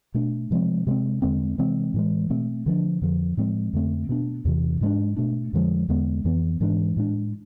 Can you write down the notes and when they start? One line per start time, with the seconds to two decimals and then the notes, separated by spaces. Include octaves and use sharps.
0.14 B2 A3 D4
0.51 C3 F3 G#3 C4
0.87 C3 G#3 C4
1.22 E2 D3 G#3 C4
1.58 C3 E3 G#3 C4
1.94 A2 E3 G#3
2.30 B2 A3 C4
2.66 D3 F3 B3 D4
3.01 F2 D3 F3
3.37 A2 F3 G#3 C4
3.73 F2 D3 A3 C4
4.09 B2 B3 D4
4.45 E2 C3 E3
4.81 G#2 G#3 B3 D4
5.17 B2 A3 D4
5.53 F2 D3 F3 G#3
5.89 E2 D3 G#3 B3
6.25 F2 E3 B3
6.60 G#2 E3 G#3 D4
6.97 A2 G#3 D4